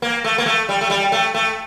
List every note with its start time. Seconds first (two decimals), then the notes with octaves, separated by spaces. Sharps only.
0.02 A#3
0.24 A3
0.38 A#3
0.46 A3
0.69 G3
0.81 A3
0.90 G3
1.12 A3
1.34 A3